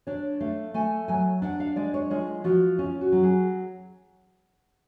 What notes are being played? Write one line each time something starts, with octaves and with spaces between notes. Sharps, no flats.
D4 C#5
A3 F5
A3 G#5
F#3 G#5
D4 F#5
F5
G#3 D5
C#5
G#3 F4
F3 F#4
C#4 F4
F#4
F#3
G#4